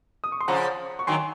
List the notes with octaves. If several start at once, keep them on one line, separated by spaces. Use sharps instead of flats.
D#6
C#6
C6
C#3 F3 F#5 A#5
C#6
D#3 F#3 G#5 C6